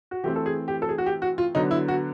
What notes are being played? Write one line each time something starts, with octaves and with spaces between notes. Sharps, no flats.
F#4
E3 A3 C4 G4
A4
G#4
G4
A4
G#4
F#4
G4
F#4
F4
D3 F#3 B3 D#4
E4
F#4